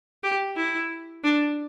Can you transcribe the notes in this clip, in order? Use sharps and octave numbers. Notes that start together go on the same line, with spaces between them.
G4
E4
D4